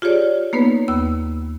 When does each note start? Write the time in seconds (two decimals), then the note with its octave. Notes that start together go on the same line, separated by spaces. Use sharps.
0.02 F4 G4 G#4 C#5 D5
0.53 A#3 B3 D#4 B4 C#5
0.88 D#2 B3 E6